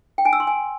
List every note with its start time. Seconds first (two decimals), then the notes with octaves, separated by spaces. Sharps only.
0.18 G5
0.25 G#5
0.33 E6
0.40 C6
0.47 G#5